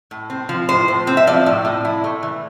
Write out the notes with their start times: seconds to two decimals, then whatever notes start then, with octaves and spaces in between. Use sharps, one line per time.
0.11 A2
0.30 C4
0.49 F3
0.69 A2 C5
0.88 A2
1.07 C4
1.17 E5
1.27 F3 D5
1.46 A2
1.65 A2
1.85 E4
2.04 A3
2.23 E3